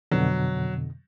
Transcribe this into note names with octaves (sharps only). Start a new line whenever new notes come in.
F2 B2 D3 F#3